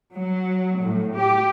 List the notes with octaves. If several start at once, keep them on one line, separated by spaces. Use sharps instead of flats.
F#3
A2
G4